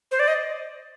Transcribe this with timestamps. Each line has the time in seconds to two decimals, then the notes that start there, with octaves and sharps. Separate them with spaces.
0.11 C5
0.19 D5
0.28 D#5